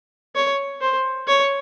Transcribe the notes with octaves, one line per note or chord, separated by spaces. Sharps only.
C#5
C5
C#5